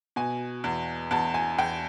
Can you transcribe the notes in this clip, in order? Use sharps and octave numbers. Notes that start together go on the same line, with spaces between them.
B2 G#5
E2
E2 A5
G#5
E2 G5